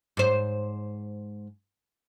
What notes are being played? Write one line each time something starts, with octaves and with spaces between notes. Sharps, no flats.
G#2 C5